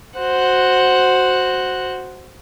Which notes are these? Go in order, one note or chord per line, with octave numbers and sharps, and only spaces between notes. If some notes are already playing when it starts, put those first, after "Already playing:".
F#4 C5 F#5 F#6